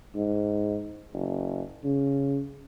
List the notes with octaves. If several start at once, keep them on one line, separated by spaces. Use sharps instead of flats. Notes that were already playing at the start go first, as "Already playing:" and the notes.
G#2
F#1
C#3